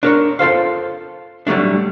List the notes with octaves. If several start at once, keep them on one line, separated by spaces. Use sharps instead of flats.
D4 A#4 C#5
F4 A4 C5 F5
D3 F#3 G3 A3 D4